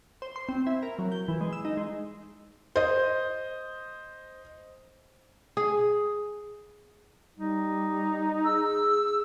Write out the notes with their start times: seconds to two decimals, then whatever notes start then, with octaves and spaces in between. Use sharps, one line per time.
0.22 C5
0.36 C6
0.49 C4
0.67 E4
0.83 A#4
0.99 F#3
1.12 G6
1.28 E3
1.41 G#3
1.53 E6
1.65 D#4
1.77 G#3
2.76 C5 D#5
5.57 G#4
7.37 G3 D#4
8.44 G#4 E6